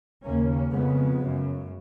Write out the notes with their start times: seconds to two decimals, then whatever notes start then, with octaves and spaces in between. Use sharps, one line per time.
0.24 D#2 C#3 A#3 C#4
0.71 F2 C#3 G#3 B3
1.19 F#2 C#3